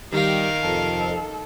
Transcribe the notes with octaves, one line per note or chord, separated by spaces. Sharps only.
D#3 G3 G4 A#4 F5
F2 C3 A4